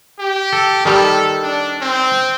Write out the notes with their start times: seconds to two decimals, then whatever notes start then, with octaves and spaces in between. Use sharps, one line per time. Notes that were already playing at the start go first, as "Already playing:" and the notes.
0.19 G4
0.53 A4
0.85 D#3 G3 G4 A4
1.42 D4
1.81 C4